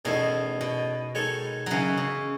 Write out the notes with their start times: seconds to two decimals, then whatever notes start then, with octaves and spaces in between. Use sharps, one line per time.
0.05 E2 B2 D#3 A3 C#4 E4
0.61 B2
1.15 D#3 G#3 D#4 A4 C#5
1.66 C#3 E3 F#3
1.97 C#3